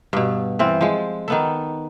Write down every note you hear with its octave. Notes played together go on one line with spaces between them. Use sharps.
G2 B2
E3 C4 F4
F3 G#3
D#3 B3 A4